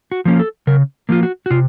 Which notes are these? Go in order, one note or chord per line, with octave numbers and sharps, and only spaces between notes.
F#4
F3 A#3 C#4
A4
C#3 A#4
F3 A#3 F4
F#4
F#4
C3 F4